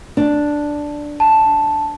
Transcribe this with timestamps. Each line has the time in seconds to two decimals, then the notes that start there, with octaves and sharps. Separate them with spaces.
0.17 D4
1.20 A5